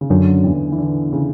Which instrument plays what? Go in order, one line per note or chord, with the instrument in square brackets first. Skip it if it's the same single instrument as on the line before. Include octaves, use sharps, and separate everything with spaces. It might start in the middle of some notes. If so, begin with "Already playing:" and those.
[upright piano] C#3
[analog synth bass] F#2 [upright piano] D3
[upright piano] E2 E3
E3
D3
C#3